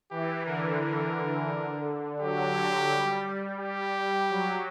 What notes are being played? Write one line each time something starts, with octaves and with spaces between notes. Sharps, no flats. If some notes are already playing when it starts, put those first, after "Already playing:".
E3 G4
D3 A#4
A#4
F#3 G4
G3
G4
F#3